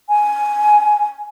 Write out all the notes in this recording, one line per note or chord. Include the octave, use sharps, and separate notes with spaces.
G#5